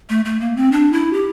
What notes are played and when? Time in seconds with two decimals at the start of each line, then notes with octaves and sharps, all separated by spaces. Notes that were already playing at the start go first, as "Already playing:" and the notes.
0.10 A3
0.25 A3
0.40 A#3
0.56 C4
0.72 D4
0.93 E4
1.13 G4